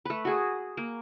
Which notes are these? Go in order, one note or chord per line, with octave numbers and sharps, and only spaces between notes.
A3 B4
F#4 G#4
A#3